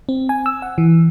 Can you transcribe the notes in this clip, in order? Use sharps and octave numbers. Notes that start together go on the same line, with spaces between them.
C4
G#5
E6
F#5
E3